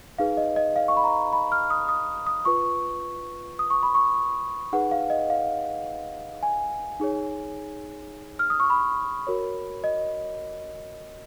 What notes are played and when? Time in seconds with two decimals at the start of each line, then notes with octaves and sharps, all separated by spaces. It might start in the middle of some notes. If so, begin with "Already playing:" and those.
0.19 D#4 G#4 B4 F5
0.37 D#5
0.56 D#5
0.76 F5
0.88 C#6
0.97 B5
1.04 A#5
1.33 B5
1.52 F6
1.70 D#6
1.89 D#6
2.27 D#6
2.45 F4 B4 C#6
3.59 D#6
3.70 C#6
3.83 B5
3.95 C#6
4.73 D#4 G#4 B4 F#5
4.91 F5
5.10 D#5
5.30 F5
6.43 G#5
7.00 D#4 G#4 C#5
8.39 F6
8.50 D#6
8.60 C#6
8.70 B5
9.27 F#4 A#4 C#5
9.84 D#5